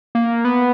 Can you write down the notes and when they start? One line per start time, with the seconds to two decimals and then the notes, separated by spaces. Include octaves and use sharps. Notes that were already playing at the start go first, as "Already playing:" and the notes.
0.15 A#3
0.45 B3